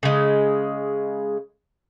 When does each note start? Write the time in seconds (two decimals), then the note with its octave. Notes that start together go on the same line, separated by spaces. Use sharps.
0.03 C#3 G#3